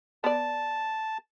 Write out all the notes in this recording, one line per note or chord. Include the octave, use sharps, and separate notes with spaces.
B3 D5 A5